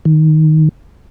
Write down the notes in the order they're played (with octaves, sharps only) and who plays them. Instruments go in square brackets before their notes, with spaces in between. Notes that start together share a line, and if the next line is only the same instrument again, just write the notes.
[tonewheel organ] D#3